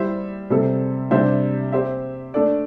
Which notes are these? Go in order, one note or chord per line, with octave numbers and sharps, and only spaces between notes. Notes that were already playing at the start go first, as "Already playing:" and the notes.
Already playing: G3 E4 C5 E5
C3 G3 C4 A4
C3 G3 D4 C5 E5
C4 G4 C5 E5
A3 D4 A4 D5